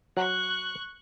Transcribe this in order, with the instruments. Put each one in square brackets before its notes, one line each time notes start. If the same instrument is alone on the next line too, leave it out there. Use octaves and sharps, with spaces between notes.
[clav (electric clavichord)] F#3 [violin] C#6 F#6